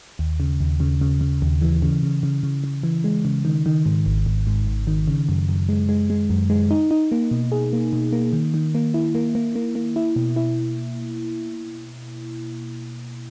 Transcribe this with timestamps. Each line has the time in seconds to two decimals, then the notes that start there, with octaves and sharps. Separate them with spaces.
0.19 D#2
0.40 C#3
0.60 D#2
0.80 C#3
1.01 C#3
1.21 C#3
1.42 D#2
1.61 E3
1.82 C#3
2.03 C#3
2.23 C#3
2.43 C#3
2.64 C#3
2.83 E3
3.04 G#3
3.25 C#3
3.45 D#3
3.66 D#3
3.86 G#2
4.06 G#1
4.26 G#1
4.47 G#2
4.67 G#1
4.87 D#3
5.08 C#3
5.29 F#2
5.49 F#2
5.69 G#3
5.89 G#3
6.10 G#3
6.30 F#2
6.50 G#3
6.71 D#4
6.91 D#4
7.12 A#3
7.31 B2
7.52 G#4
7.73 A#3
7.93 B2
8.13 A#3
8.33 D#3
8.54 D#3
8.75 A#3
8.94 E4
9.15 A#3
9.35 A#3
9.55 A#3
9.75 A#3
9.96 E4
10.16 B2
10.36 E4